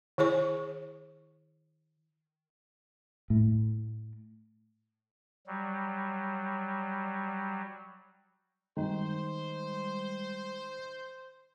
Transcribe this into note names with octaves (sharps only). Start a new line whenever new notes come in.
D#3 E4 G#4 C#5 C#6
A2
F#3 G3
D#3 G3 G#3 C5